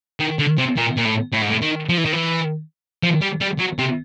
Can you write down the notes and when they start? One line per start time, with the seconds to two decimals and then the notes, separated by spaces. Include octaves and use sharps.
0.20 D#3
0.39 D3
0.58 C3
0.77 A#2
0.97 A#2
1.05 A2
1.32 A2
1.42 G#2
1.50 A2
1.62 D#3
1.89 F3
1.98 E3
2.05 D#3
2.13 E3
3.03 F3
3.21 G3
3.41 G3
3.59 F#3
3.78 C3